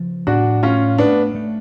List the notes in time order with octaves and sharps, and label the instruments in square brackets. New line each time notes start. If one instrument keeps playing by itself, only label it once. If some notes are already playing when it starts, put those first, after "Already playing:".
Already playing: [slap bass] C#3 F3
[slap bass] A2 [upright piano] D4 F#4
[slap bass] A3 [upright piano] C#4 F4
[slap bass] A3 [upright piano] B3 D4
[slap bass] A3